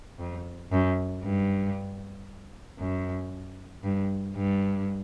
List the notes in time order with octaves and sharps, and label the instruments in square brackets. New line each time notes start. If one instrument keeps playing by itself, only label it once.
[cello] F2
F#2
G2
F#2
G2
G2